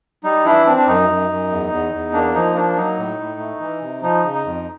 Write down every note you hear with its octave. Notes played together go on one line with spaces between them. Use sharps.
G3 D#4
E3 D4 E4
C4 D4
D4
F#2 D#4
F#2
F#2
E2
E2
E2
A#3 D4
F3 D#4
A#3 D4
F#3 D#4
A2
A2
A3
E3
C3
F3 D#4
C#3
D#4
F2